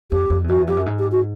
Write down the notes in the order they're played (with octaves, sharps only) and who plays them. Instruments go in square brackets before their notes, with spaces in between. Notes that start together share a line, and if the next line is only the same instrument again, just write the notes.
[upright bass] F2 [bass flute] G4
[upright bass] F2
E2
[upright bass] F2 [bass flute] F#4
[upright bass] E2
[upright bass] F2 [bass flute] G4
[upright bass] F#2
G#2
[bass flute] G4
F#4